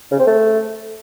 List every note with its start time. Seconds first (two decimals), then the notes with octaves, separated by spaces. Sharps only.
0.12 C#3
0.19 C4
0.27 A3